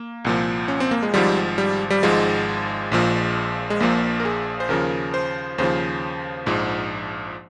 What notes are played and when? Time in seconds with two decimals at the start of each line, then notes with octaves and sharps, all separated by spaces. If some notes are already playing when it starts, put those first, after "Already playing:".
Already playing: A#3
0.25 C2 A#2 F3
0.68 C#4
0.80 C4
0.91 A#3
1.03 G#3
1.14 G#1 G#2 F3 G3
1.58 G3
1.90 G3
2.03 G#1 G#2 F3 G#3
2.92 A#1 A#2 F3
3.70 G#3
3.80 A#1 A#2 F3 A#3
4.20 A#4
4.25 G#4
4.60 C5
4.69 D#2 C#3 F3 A#4
5.14 C5
5.58 D#2 C#3 F3 C5
6.46 A#1 G#2 F3